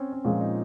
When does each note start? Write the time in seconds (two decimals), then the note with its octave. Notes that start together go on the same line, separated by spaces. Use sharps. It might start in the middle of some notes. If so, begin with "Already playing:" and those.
Already playing: C4 C#4
0.13 C#4
0.24 A#2 F3 G#3 C#4
0.41 D#4